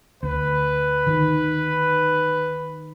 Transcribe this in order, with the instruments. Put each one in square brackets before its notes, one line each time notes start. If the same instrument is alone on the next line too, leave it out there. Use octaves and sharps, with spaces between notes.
[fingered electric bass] D2 [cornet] B4
[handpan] D#3